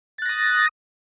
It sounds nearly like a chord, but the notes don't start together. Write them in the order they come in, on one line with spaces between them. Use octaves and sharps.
A6 F#6 A#6 D#6